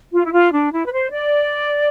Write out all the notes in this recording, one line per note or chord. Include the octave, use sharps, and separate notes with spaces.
F4
E4
F4
D4
E4
B4
C5
D5